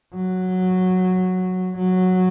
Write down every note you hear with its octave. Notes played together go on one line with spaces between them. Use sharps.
F#3
F#3